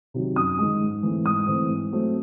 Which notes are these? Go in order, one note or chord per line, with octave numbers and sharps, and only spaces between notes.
C3 D#3 F#3
F#2 D#6
D#3 G#3
G#2
E3 A3 C4
G#2 D#6
E3 A3 C4
G#2
F#3 A3 C4